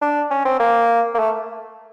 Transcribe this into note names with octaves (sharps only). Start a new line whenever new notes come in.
D4
C#4
C4
A#3
A#3
A3